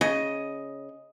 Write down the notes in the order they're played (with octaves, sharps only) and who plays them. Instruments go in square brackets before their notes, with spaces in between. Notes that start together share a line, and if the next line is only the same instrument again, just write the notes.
[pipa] C#3 [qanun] D#5